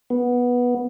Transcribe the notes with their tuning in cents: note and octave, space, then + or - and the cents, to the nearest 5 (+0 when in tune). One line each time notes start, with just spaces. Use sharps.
B3 -10